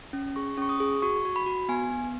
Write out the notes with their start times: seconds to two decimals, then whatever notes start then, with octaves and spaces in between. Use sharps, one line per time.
0.13 C#4
0.36 G#4 C#6
0.57 C#4 C#6
0.69 D#6
0.80 G#4
1.02 F#4 C#6
1.25 F#4
1.36 B5
1.46 F#4
1.69 B3 G#5
1.91 B3